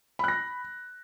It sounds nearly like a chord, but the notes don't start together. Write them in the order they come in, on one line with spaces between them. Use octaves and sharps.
B5 F#6 A#6